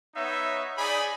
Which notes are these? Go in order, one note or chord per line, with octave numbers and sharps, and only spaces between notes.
B3 D#4 C#5 E5
D#4 G#4 D5 B5